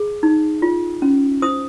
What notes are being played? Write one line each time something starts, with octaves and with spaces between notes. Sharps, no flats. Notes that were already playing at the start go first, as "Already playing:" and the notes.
Already playing: G#4
D#4
F4
C#4
C5 D#6